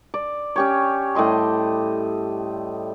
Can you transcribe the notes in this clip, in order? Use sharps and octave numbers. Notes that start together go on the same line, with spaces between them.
D5
C#4 G4 C#5
A2 G3 D#5 C6